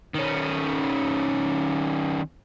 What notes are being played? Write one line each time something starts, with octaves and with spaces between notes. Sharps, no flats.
D#3 C#4